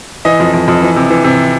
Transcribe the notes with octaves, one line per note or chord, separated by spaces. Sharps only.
E3 D#5
F2
F2
F2
E3
C3
E3
C3